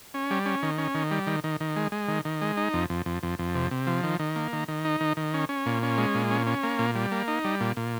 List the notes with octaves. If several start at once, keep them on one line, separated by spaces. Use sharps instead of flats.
C#4
G3
C#4
D#3
C#4
D#3
G3
D#3
D#3
D#3
G#3
G#3
D#3
D#3
G#3
D#4
F2
F2
F2
F2
F2
C3
C3
F3
D#3
D#3
A#3
D#3
D#3
D#4
D#3
D#3
C#4
C#4
A#2
C#4
G#3
A#2
C#4
C#4
A#3
A#2
G3
A#3
D#4
G3
A#2
A#2